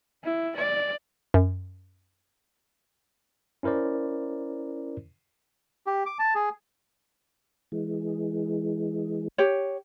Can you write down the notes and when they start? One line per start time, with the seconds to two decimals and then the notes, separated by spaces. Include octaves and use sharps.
0.24 E4
0.57 D5
1.34 F#2
3.63 C#4 E4 A#4 C5 D5
5.87 G4
6.06 D6
6.19 A5
6.35 G#4
7.72 E3 G#3
9.38 G4 C#5